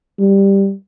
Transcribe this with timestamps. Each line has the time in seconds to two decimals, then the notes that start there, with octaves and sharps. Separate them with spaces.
0.19 G3